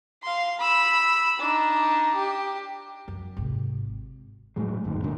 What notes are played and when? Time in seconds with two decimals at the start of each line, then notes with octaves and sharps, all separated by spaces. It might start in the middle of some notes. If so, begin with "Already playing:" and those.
0.23 F5 C6
0.60 B5 E6
1.39 D4 D#4
2.16 G4
3.08 F#2
3.37 G#1 C3
4.56 A2 F#3 G#3
4.84 G1 D#2 G#2
5.03 A#2 D3 F#3 A#3